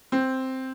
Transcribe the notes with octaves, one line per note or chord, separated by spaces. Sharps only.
C4